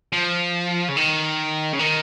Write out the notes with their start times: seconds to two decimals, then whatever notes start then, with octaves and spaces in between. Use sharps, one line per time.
0.13 F3
0.88 C#3
0.97 D#3
1.73 C#3
1.79 D#3